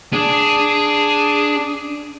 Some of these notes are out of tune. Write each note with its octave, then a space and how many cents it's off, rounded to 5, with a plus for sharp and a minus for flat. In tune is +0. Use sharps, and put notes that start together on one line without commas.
D4 +0 G#4 +0